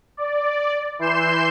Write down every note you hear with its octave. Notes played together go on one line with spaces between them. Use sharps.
D5
E3 C6 G6 C7 E7